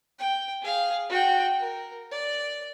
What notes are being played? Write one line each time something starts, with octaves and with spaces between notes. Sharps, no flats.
G5
G#4 F5
F#4 G5
A#4
D5